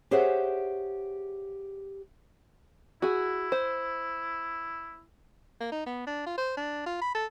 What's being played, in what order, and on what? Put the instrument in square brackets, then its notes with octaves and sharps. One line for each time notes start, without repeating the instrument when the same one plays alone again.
[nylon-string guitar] G4 G#4 C5 C#5 E5 F#5
[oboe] E4 [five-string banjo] F#4 G#4
[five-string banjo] C5
[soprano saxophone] A#3
D#4
B3
D4
F4
C5
D4
F4
B5
A4